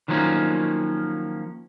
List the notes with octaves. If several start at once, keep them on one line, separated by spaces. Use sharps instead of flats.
D#3 F3 F#3 A#3 C#4